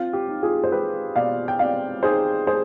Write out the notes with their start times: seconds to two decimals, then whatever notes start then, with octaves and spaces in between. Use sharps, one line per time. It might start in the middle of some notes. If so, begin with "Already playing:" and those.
Already playing: C4 F4
0.13 G4
0.28 D#4
0.43 F4 G#4
0.64 C5
0.71 G#3 G4 B4
1.16 B2 D5 F5
1.48 G5
1.59 C4 D5 F5
2.03 D#4 G#4 C5
2.47 G#3 G#4 C5